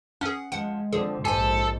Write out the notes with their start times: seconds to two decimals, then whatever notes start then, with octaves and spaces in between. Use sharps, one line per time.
0.21 C#4 G#4 F#5
0.52 F3 G#3 F#5
0.93 D3 F3 C4 G#4
1.25 A#1 G#2 G4 A4 C5 G#5